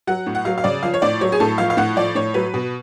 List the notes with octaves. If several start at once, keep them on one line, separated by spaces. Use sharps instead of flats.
F#3 F#5
A2
F#5
F#3 F5
F5
C#3 D5
F3 F5
C#5
A2 D5
F#3 C#5
G#4
A2 A4
F3 F5
F5
A2 F#5
F3 D5
A2 C#5
F#3 B4
B2